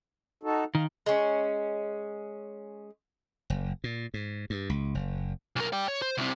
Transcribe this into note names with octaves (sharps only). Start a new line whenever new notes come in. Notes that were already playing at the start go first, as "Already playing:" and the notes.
D#4 F#4 A4
D#3 F5
G#3 C#4
F#1
A#2
G#2
G2
C#2
F#1
B1 A#4
D5 G5
C#5
C5
C2 C3